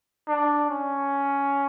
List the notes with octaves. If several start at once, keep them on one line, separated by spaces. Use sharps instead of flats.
D4
C#4